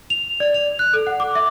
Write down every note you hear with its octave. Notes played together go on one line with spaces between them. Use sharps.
F7
D5
F7
F#6
A4
F#5
D6
E5